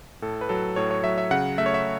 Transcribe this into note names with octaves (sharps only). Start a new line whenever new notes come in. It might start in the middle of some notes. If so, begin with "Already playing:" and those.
A2 A4
B4
F#3 A4
A2 C#5
C#5
F#3 E5
E5
C#3 F#5
A3 E5
C#5
E5